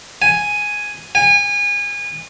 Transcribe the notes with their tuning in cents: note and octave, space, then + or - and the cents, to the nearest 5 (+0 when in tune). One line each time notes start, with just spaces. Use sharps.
G#5 +0
G#5 -30